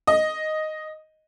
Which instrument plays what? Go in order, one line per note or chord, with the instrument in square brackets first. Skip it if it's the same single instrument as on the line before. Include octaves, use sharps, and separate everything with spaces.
[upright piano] D#5